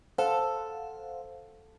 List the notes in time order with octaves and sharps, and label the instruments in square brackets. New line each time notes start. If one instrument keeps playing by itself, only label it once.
[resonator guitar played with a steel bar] A4 [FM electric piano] C5 F5 F#5